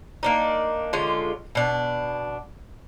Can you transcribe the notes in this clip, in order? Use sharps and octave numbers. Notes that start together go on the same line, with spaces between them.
A#3 D4 D#4
D3 G#3 C#4 F4
B2 D4